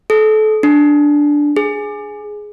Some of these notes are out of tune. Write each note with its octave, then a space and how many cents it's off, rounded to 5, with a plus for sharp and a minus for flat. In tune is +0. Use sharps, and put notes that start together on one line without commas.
A4 -30
D4 +0
G#4 +5